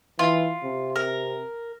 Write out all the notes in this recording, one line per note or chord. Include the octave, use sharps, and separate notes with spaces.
E3 F4
C3
A#4